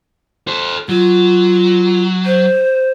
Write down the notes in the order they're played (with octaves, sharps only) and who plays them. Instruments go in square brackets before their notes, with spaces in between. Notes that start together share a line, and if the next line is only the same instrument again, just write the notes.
[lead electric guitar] A4 C5
[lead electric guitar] F#3 [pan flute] F4
[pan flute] C5